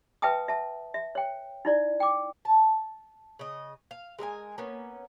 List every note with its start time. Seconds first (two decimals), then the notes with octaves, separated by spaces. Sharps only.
0.22 B4 E5 G5 A5 D#6
0.48 E5 A5
0.94 E5
1.15 C#5 G5
1.65 D#4 E4 D5
2.00 G5 D6
2.45 A5
3.39 C#3 D#5
3.91 F5
4.19 G#3 A#4 D#5 G#5
4.58 A#3 B3 C#4